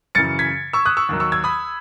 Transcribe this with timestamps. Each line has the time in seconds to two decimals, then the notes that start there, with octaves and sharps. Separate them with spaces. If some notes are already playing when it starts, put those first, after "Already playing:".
0.15 F#2 C#3 E3 A6 C#7
0.39 G#6 B6
0.73 C#6 E6
0.85 D#6 F#6
0.97 C#6 E6
1.09 D#2 D#3 F#3
1.20 C#6 E6
1.32 E6 G#6
1.44 B5 D#6